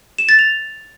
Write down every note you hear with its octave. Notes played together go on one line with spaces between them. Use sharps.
E7
A6
F7